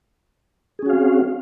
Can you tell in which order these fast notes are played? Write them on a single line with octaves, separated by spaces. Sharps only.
G#4 C#4 F#4 F5 C4